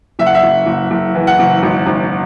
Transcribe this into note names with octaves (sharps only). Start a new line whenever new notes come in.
F#1 E5
F#5
E5
F#1
F#1
F#1
E3
F#5
F#1
G#1
G#1